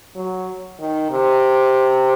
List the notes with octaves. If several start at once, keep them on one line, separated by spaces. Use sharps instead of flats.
F#3
D#3
C3